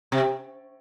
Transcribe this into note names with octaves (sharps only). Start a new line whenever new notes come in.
C3